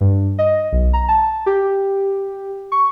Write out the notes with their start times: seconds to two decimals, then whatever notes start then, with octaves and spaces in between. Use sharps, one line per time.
0.01 G2
0.39 D#5
0.72 B1
0.93 A#5
1.08 A5
1.46 G4
2.72 C#6